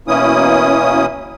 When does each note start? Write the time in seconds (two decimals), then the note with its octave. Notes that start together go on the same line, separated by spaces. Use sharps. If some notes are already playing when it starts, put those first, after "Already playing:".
0.08 B2 E3 A#3 C#4 E4 D#6